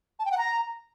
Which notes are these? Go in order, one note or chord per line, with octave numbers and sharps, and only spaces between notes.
A5
G5
F#5
A#5